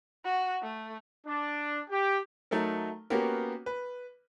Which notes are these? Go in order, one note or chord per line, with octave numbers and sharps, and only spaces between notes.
F#4
A3
D4
G4
F#3 A3 D#4 A4 A#4
A#3 B3 C#4 F#4 G4 A#4
B4